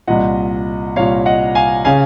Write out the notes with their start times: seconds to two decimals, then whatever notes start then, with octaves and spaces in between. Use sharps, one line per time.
0.07 C2 A#2 D#5 F#5
0.96 C2 A#2 C#5 F5
1.26 D#5 F#5
1.55 F5 G#5
1.84 C#3 F5 G#5